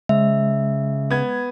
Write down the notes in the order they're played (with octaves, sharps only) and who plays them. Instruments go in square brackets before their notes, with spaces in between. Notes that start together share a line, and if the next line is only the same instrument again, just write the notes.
[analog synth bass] C#3 [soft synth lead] G#3 [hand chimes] E5
[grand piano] B3 G#6